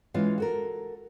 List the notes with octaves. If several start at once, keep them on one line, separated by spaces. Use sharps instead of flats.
E3 G#3 C#4 F4 C#5 F5
F#4 A4 A#4